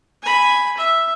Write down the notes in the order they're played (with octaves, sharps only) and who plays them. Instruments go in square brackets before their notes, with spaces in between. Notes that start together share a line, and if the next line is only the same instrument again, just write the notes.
[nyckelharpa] G#5 B5
E5